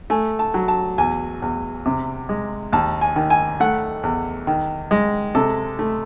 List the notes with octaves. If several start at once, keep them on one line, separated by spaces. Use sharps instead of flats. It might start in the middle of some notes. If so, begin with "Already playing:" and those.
A3 G#5
A5
F#3
A5
E2 G#5
E2
C3
G#3
D#2 A5
G#5
D#3
G#5
A3 F#5
E2
D#3
G#3
C3 A4
A3